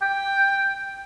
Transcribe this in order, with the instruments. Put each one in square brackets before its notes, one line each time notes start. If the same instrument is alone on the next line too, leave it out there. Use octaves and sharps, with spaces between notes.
[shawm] G5